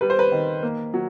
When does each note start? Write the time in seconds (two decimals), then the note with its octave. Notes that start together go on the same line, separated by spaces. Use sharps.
0.01 G3 B4
0.10 C5
0.19 B4
0.32 D#3
0.63 A#3
0.94 F#3